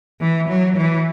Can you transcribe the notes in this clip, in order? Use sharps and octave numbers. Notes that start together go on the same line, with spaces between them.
E3
F#3
E3